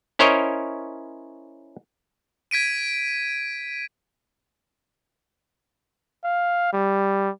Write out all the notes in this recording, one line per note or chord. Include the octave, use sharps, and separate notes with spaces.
C#4 E4 A#4 C5 C#5 D#5
G#6 B6 D7 D#7
F5
G3